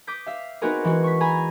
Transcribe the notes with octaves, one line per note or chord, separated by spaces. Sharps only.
D6 D#6 G6 B6
E5 F5
B3 C4 D#4 F#4 G#4 A#4
E3 G#3 F#4
C#6 B6
G#4 G#5 A#5 B5